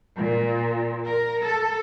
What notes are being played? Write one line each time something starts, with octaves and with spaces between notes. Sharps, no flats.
A#2
A#4
A4